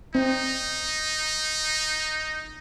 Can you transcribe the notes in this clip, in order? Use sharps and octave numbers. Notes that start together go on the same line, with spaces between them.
C4 D#4